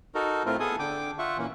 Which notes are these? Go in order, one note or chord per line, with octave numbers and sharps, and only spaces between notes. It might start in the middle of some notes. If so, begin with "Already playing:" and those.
D#4 F#4 A4 A#4
A2 A3 C4 E4 F4 A#4
B3 G#4 A4 G#5 D#6
D3 G5 D6
F4 E5 F#5 C#6
A#2 E3 A#3 C#4